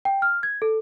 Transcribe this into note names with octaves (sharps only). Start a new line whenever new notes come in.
G5
F6
G#6
A4